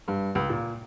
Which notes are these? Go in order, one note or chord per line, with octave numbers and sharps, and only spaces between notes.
G2
C#2
A#2